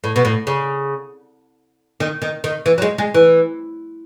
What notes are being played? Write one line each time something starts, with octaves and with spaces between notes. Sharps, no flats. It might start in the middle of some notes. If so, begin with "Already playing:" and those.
A2
B2
A2
C#3
D#3
D#3
D#3
E3
F#3
G#3
G#3
E3